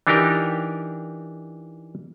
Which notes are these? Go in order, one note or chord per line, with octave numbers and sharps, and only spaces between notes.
E3 D4 D#4 G4 A#4 G5